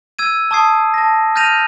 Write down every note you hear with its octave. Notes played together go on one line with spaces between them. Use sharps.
E6 G#6 D#7
A5 C#6 D#6 G#6 C7 D7
A5 A#6
F6 G6 A6 A#6 D#7 F7